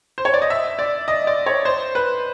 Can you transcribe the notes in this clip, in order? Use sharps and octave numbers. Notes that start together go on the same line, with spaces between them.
C5
C#5
D5
D#5
E5
D5
D#5
D5
C#5
C5
B4